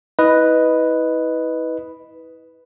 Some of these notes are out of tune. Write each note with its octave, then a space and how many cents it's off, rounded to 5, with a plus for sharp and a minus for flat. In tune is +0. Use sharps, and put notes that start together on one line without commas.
E4 -30 B4 +0 D#5 +0